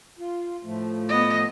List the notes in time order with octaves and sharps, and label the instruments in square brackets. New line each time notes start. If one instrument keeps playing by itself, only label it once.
[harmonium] F4
A2 F3 A3
[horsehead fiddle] B3 D#5